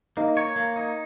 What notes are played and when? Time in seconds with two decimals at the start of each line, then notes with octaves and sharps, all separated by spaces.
0.17 A#3 D#4
0.37 C#5
0.56 A#3
0.76 D#4